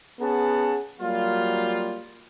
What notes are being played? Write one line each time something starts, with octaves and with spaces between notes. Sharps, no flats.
B3 C#4 G#4 F#5 A5
F#3 G3 A#3 F4